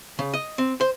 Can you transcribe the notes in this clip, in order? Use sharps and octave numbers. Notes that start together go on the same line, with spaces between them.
C#3
D#5
C4
C5